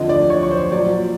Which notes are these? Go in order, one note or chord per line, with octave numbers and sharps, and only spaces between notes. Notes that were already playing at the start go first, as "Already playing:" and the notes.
Already playing: F2 D3 F3 D#5
D5
C#5
C#5
C5
A#2 F#3 D5